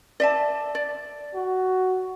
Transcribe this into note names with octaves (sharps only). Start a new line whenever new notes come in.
D5 E5 A5
D5
F#4